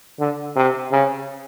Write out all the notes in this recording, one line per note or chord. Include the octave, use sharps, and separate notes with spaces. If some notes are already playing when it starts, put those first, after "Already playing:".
D3
C3
C#3